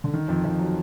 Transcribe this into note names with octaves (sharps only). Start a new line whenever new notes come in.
D3
D#3
F2 F3
F2 F3
F#3